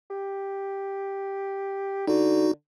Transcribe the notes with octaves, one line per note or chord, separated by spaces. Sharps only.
G4
D3 D#4 F#4